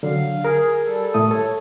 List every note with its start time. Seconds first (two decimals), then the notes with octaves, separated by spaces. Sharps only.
0.03 D3 F#3 F5
0.45 G#4 A#4
0.86 G3 A4
1.14 A2 A3 D#6
1.31 A4 C#5